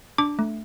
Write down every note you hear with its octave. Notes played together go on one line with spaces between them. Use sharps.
D4 D6
A3